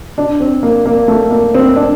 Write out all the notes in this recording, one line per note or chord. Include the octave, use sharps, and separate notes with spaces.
D4
C4
A#3
A#3
A3
A#3
C4
D4